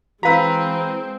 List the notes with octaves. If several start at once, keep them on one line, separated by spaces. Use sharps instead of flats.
E3 G#3 C4 F#4 B4 F5 A#5 E6